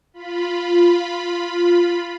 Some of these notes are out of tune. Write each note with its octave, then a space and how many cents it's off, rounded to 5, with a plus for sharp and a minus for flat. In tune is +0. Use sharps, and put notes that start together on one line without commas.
F4 +0 B5 +0